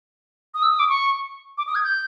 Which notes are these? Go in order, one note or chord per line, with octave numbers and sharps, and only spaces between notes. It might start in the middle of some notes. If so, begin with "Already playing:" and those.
D#6
E6
D#6
D6
C#6
D6
D#6
G#6
G6